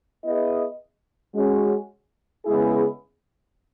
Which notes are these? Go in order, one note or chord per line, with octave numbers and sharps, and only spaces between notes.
B3 E4 G#4 D#5
G#3 C#4 F#4
C#3 G#3 B3 E4 G#4